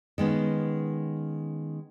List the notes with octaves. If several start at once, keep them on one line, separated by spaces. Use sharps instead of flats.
D#3 G#3 B3 C#4